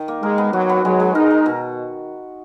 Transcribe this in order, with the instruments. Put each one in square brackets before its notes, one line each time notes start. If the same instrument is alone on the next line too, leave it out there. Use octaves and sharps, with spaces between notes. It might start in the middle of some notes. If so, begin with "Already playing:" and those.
Already playing: [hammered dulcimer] D#3
A#3
[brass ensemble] G#3 [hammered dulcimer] A#4
[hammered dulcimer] B3
[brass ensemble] F#3 [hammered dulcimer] F#4
[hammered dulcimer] B3
[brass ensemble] F#3 [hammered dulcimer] G#3
[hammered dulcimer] G#3
[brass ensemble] D#4 [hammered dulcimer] A#4
[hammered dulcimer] A#4
B2